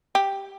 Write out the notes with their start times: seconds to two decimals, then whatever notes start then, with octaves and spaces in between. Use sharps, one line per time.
0.15 G4